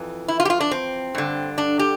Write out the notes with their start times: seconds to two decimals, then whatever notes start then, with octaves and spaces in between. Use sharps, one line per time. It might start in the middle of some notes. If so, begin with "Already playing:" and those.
Already playing: F2 E3
0.28 E4
0.40 F4
0.45 G4
0.50 F4
0.60 D4
0.71 C4
1.15 G2 D3
1.58 D4
1.79 G4